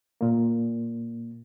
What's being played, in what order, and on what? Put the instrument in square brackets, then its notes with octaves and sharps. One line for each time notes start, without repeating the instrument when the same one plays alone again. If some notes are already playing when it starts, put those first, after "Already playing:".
[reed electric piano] A#2 A#3